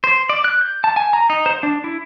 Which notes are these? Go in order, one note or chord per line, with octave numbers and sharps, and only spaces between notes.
C5
D5
F#6
G6
A5
G#5
A#5
D#4
C5
D4
E4